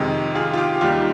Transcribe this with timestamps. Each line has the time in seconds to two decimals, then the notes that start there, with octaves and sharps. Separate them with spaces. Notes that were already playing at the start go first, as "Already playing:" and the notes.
Already playing: F2 C3 D#3 G#3
0.35 F4 G#4
0.53 F4
0.57 G4
0.81 D#2 D#3 G3 F4